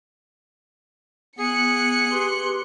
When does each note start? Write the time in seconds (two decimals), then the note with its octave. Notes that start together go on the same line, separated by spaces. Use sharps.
1.39 B3 G#4 F#6 C#7
2.11 G4 B4 C6